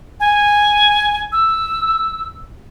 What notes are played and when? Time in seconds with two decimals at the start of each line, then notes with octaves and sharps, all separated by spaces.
0.20 G#5
1.32 E6